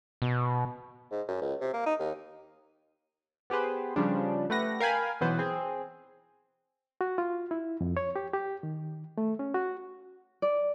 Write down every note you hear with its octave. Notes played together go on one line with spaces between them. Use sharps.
B2
G#2
F#2
C#2
C3
A#3
D#4
D#2
B3 G4 G#4 B4 C5
C#3 F3 G3 D4
A3 G4 B4 F#5 A#6
A#4 F5 G5 G#5 B5
B1 E3 F#3 B3 B4 C5
C4 G#4
F#4
F4
E4
F2
C#5
G4
G4
D#3
A3
C#4
F#4
D5